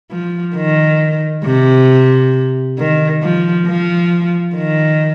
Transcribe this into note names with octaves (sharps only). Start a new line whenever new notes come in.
F3
D#3
C3
D#3
F3
F3
D#3